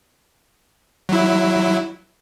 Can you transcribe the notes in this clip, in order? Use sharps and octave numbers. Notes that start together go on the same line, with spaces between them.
F#3 E4